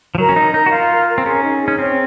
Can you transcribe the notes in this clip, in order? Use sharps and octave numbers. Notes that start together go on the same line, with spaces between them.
F3
F#3 A#4
C#4
D#4 A#5
D#4 A#4
F#4
F4 F5
A#4
A#4
C4
C#4 G#4
D#4
G#4
C#4
C4 C#5